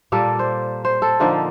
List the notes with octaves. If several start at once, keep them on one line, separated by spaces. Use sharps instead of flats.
A#2 G3 A#3 A4
C5
C5
A4
D3 F3 A#3 D#4